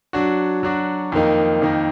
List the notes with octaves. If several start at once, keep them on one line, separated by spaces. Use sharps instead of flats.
F#3 D4 F#4
F#3 D4 F#4
F2 D#3 A#3 D#4
F2 D#3 A#3 D#4